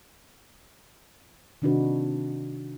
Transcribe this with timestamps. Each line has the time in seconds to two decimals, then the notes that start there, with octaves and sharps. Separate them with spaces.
1.62 C3 D#3 D4 D#4 F#4 B4